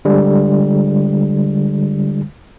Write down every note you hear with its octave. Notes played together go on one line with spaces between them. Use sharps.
D3 G3 G#3